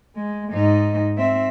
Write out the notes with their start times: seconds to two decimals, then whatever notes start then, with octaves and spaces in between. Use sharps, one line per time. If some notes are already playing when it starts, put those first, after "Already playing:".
0.16 G#3
0.52 G#2 D#4
1.18 C4 E5